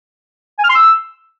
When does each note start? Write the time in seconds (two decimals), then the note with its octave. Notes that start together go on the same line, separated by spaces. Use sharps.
0.59 G#5
0.64 F6
0.70 C6
0.75 E6